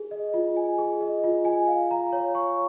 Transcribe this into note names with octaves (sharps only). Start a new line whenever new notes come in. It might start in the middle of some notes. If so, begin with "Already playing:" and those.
Already playing: G#4
D#5
F4
G#5
G#4
D#5
F4
G#5
F5
A#5
C#5
C#6